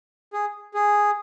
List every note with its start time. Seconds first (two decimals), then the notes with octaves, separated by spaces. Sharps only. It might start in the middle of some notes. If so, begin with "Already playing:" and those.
0.33 G#4
0.74 G#4